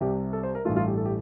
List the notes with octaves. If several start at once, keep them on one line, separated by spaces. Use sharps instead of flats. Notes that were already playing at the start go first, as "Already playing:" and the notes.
C2 C3 G3 G4
A4
C5
A#4
A1 G2 E3 A3 F4
F4
G4
A4
G4